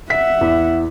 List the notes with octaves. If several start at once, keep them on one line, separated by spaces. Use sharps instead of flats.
E5 F#5 B6
E2